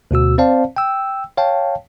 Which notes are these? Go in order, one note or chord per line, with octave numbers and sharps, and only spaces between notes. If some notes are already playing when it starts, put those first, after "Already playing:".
D2 B2 F#4 E6
C4 C5 D5 F5 A5
G5 E6
C#5 F5 G5 A5